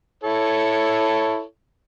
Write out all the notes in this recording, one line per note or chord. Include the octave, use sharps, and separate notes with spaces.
E4 A4 C#5